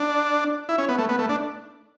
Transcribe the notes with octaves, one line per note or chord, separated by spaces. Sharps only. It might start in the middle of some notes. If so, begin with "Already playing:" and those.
Already playing: D4
E4
C#4
B3
A3
B3
A3
D4